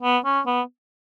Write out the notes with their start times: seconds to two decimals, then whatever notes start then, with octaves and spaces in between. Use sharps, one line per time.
0.03 B3
0.25 C#4
0.46 B3